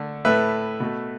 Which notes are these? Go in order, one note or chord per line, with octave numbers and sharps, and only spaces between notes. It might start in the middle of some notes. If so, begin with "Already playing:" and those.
Already playing: D3 A3
A2 A3 B4 E5
B2 A3